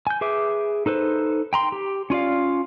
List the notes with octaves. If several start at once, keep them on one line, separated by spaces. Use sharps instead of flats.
G#5 G6
G#4 B4 E5 D6
D#4 A4 B4 C5
G5 A#5 C6
G4
C#4 F4 D5 F5